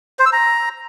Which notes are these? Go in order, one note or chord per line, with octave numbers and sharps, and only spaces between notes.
C5
E6
A#5